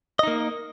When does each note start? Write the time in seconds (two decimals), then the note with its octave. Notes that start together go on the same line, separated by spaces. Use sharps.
0.19 D#5
0.23 D#4
0.28 A#3